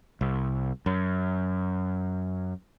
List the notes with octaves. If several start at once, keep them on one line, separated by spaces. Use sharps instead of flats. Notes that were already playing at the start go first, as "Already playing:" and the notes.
C2
F#2